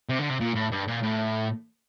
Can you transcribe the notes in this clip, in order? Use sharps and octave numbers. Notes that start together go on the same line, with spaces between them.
C3
D3
C3
A#2
A2
G2
A#2
A2